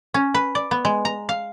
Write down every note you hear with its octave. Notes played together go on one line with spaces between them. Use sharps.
C#4
B4
D5
B3
G#3
A#5
F5